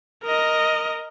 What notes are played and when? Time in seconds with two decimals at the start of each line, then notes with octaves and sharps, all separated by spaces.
0.24 A#4 D#5